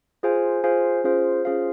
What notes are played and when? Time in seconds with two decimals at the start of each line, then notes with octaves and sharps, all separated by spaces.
0.23 F4 G#4 C5 F5 G#5
0.64 F4 G#4 C5 F5 G#5
1.04 C#4 F4 G#4 C5 F5
1.45 C#4 F4 G#4 C5 F5